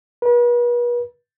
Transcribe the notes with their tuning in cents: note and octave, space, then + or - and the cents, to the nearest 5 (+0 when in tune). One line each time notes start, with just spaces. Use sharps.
B4 -40